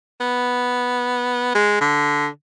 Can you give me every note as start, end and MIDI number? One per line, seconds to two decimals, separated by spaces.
0.20 1.50 59
1.55 1.76 56
1.81 2.27 50